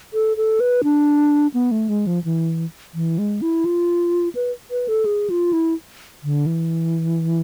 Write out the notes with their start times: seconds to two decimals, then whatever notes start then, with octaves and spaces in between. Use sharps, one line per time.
0.14 A4
0.37 A4
0.60 B4
0.84 D4
1.54 B3
1.71 A3
1.89 G#3
2.07 F3
2.24 E3
2.94 E3
3.18 G#3
3.42 E4
3.65 F4
4.35 B4
4.71 B4
4.88 A4
5.05 G#4
5.30 F4
5.53 E4
6.23 D3
6.46 E3